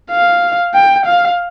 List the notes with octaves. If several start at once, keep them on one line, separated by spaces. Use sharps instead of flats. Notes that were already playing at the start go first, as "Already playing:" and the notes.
F5
G5
F5